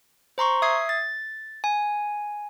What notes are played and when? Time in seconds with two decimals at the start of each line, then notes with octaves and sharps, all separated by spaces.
0.38 C5 A#5 C6 C#6
0.62 E5 D#6 G#6 C7
0.89 A6
1.64 G#5